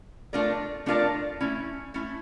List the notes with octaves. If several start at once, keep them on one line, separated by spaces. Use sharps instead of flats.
A3 D4 F4 A#4 D5
A3 D4 F4 A#4 D5
A3 C#4 E4
A3 C#4 E4